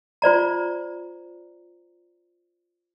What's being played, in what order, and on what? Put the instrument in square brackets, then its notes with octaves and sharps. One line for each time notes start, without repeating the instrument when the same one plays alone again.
[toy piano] F4 C5 D5 A#5